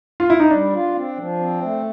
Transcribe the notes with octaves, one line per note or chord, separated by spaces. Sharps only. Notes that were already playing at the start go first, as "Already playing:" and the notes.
F4
E4
D#4
G3 D4
F4
C4
F3
C4
A3